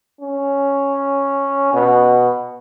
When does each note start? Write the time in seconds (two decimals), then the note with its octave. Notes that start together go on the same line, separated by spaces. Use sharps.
0.21 C#4
1.73 B2